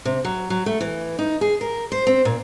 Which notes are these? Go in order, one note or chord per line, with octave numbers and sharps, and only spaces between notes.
C3
F#3
F#3
A3
E3
D#4
G#4
A#4
C5
C4
A#2